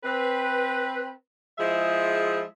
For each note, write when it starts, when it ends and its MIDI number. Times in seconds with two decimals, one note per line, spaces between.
0.03 1.09 60
0.03 1.09 71
1.58 2.41 53
1.58 2.41 56
1.58 2.41 64
1.58 2.41 68
1.58 2.41 76